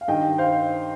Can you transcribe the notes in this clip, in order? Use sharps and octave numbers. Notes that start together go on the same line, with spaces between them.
F5
G2 D#3 D#5 G5
C5 F5